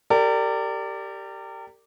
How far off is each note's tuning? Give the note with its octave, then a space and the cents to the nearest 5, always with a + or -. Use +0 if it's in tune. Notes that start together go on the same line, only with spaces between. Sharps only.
G4 +0 A#4 -35 D5 +0